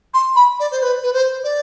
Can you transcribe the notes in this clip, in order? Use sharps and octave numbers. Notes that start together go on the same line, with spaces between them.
C6
B5
D5
C5
B4
B4
C5
D5